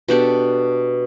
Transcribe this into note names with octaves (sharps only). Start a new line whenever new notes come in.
B2 D4 G4 A4